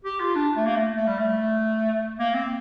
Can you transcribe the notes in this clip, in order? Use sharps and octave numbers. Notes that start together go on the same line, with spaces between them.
G4
F4
D4
A3
A#3
A3
A3
G3
A3
A#3
C4